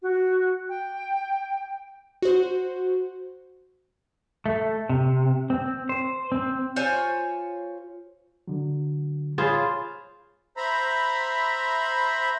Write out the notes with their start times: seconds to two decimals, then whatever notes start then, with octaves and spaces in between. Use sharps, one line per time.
0.02 F#4
0.69 G5
2.22 F#4 C5
4.46 A3
4.89 C3
5.50 C4
5.89 C5
6.32 C4
6.76 F4 C5 C#5 G#5
8.48 D3 F#3
9.38 F4 G#4 C5 C#5 B5 A6
10.57 C5 E5 A#5 B5